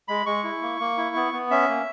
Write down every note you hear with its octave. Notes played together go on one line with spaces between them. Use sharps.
G#3 B5
G#3 C#6
E4
A#3
A#3
E4
B3
B3
C#4 E5
A#3